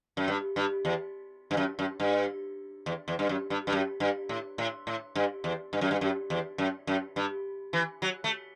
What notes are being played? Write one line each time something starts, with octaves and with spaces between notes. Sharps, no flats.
F#2
G2
G2
E2
G2
F#2
F#2
G2
E2
E2
G2
F#2
G2
G2
F#2
G2
A2
A2
A2
G2
E2
G2
F#2
G2
F#2
E2
F#2
F#2
G2
E3
F#3
A3